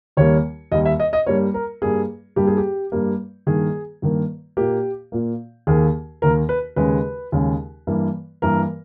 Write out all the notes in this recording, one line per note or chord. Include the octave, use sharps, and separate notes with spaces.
D#2 D#3 G3 A#3 C#5
D#2 D#3 G3 A#3 D#5
E5
D#5
D#5
G2 G3 A#3 C#5
A#4
G2 G3 A#3 G#4
G2 G3 A#3 G4
G#4
G4
G2 G3 A#3
G2 D#3 A#3 G#4
G2 D#3 A#3
A#2 A#3 G4
A#2 A#3
D#2 D#3 A#3 G#4
D#2 D#3 A#3 A#4
B4
D#2 C#3 G#3 B4
D#2 C#3 G#3
G2 E3 A#3
G2 E3 A#3 A#4